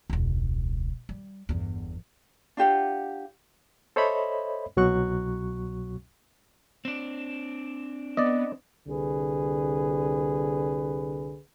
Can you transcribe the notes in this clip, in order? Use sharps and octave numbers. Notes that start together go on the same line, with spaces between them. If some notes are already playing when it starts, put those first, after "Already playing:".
E1 C#2
G3
G1 E2
D4 F4 G4 F#5
A4 C5 C#5 D#5 E5 B5
C2 B2 F#3 F#4 C#6 F#6
C4 D4
B3 D5 D#5
C2 D3 G#4 B4